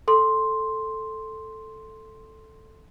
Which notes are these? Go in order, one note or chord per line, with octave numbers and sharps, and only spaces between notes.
A4 C6